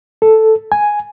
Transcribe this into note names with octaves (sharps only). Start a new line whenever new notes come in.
A4
G#5